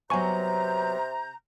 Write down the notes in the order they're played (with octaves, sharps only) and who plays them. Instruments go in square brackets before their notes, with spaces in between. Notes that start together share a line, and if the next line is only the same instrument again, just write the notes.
[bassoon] C3 [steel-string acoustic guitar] F#3 B3 [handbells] G#5 C#6 [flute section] A#5 G6